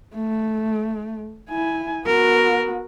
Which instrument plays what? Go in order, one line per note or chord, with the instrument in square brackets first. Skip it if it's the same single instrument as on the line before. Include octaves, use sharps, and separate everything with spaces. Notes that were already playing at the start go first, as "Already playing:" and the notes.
[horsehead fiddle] A3
E4 G#5
[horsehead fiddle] B3 F#4 [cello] A#4